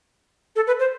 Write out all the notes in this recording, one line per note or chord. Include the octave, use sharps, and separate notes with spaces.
A4
B4
C5